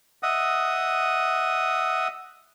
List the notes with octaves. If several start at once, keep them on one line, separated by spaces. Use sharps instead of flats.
D#5 E5 F#5 D#6